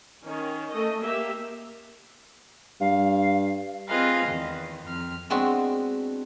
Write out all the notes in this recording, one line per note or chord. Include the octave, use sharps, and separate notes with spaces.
D#3 C#4
A3 D#5
A#3 G4 E5
G2 F5
C4 F4 G#4 B4 D#5 F5
E2 D#3
F2 F6
G#3 B3 C4 D4 F#4